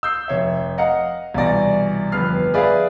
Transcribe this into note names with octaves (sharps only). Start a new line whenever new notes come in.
E6 G6 C7
F1 C#5 E5
D#5 F5 F#5 A#5 C#7
C2 B2 E3 D5 A#6
G1 F2 B4 F6 C7
G#4 B4 D5 E5 F5